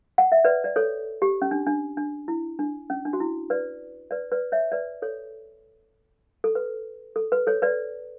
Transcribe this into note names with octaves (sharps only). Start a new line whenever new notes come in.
F#5
E5
B4 D5
D5
A4 C#5
G4
C#4
D4
D4
D4
E4
D4
C#4
D4
F#4
E4
B4 D5
B4 D5
B4 D5
C#5 E5
B4 D5
A4 C#5
A4
B4
A4
B4
A4 C#5
B4 D5